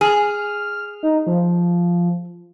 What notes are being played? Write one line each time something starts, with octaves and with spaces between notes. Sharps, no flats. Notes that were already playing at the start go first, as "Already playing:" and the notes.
G#4 F6
D#4
F3